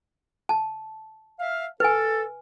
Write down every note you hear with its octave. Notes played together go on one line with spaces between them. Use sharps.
A5
E5 F5
A4 B4 G#5